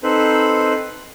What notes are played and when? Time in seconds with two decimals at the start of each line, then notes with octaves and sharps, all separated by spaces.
0.03 C4 D#4 A4 B4 C5 B5